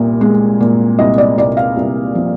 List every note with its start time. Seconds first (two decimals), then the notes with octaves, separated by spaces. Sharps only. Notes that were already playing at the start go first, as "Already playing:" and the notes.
Already playing: C2 A#2
0.21 G#3
0.60 A#2
0.99 C2 D#5
1.18 D5
1.37 C2 D5
1.57 F5
1.77 C2
2.15 F3